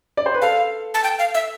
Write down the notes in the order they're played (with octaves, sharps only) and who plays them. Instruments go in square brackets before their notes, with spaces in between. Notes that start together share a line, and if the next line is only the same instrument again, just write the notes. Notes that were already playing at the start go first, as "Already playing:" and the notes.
[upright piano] D5
C5
B4
[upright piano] A4 [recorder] F5
[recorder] A5
G5
F5
E5